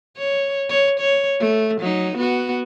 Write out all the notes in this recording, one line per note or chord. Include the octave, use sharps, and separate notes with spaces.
C#5
C#5
C#5
A3
F#3 D#4
B3 F#4